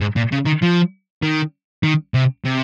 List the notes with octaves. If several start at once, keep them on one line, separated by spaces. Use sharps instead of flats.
G#2
A#2
C#3
D#3
F3
D#3
D#3
C3
C3